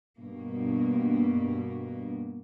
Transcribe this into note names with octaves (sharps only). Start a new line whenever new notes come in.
G2 B2 A#3